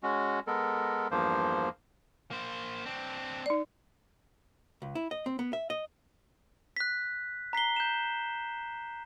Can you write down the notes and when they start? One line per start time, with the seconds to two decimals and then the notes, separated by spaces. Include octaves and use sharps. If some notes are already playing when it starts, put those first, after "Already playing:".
0.03 G#3 C#4 F#4
0.47 G#3 B3 A4 A#4
1.11 E2 G2 F3 A#3 C5
2.31 A#3 C5
2.86 C4 D4
3.46 D#4 D5
4.82 C#2
4.95 E4
5.11 D#5
5.26 C4
5.39 B3
5.53 E5
5.70 D#5
6.77 F#6 B6
7.53 A#5 B6 C7 G7
7.76 G6 E7